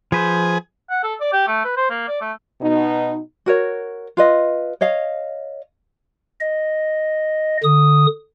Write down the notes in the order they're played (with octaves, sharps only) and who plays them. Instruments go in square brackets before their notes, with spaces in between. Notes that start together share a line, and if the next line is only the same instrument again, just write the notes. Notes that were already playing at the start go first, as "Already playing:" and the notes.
[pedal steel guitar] F3 B4 C5 [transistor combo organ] G#4
[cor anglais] F#5
A4
D5
G4
A3
B4
C5
A#3
D5
A3
[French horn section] B2 D#4
[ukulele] F#4 A#4 C#5
F4 B4 D#5
C#5 D#5 F5
[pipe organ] D#5
D3 D#6